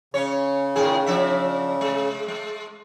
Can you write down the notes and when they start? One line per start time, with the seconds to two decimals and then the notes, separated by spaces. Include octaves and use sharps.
0.14 C#3 C#4 C#5
0.76 A2 D#3 G#4
1.06 F3 D4 E5
1.81 G#3
2.28 G#3